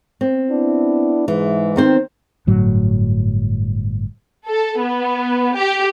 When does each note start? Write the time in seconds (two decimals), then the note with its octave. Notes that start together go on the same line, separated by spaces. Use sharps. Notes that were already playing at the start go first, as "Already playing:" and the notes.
0.21 C4
0.50 B3 D4 E4
1.28 G#2 E3 G#3
1.76 D#3 C4 C5
2.47 G1 A2 F#3
4.48 A4
4.81 B3
5.56 G4